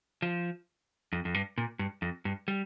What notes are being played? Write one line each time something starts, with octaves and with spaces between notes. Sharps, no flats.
F3
F2
F2
G2
A#2
G2
F2
G2
G3